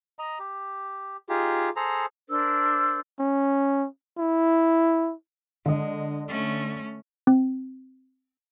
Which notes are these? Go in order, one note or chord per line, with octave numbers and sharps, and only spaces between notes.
D#5 A#5
G4
D#4 F4 G4 G#4
G#4 A4 C5 A#5
D4 A#4 C5 E6
C#4
E4
D3 G#3 D#5
A3 C#4
C4